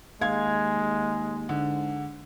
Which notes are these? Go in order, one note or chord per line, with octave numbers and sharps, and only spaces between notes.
D#2 G#3 F5 G#6
G#2 D3